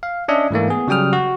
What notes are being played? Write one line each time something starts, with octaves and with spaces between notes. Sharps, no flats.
F5
C#4 D4 D#5 E5
G#2 E3 A3 A#3
B3 G#4
C#3 F#3 G3 G5 D#6 F6
F#4